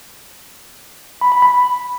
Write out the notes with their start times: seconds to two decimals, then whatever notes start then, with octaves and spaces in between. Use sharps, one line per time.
1.21 B5
1.32 B5
1.42 B5